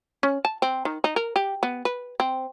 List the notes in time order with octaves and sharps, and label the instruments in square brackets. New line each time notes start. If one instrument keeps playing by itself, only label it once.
[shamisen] C#4
A5
C4
D#3
D#4
A#4
G4
B3
B4
C4